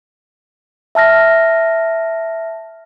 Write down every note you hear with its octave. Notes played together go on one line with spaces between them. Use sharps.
E5 A5 F6 A#6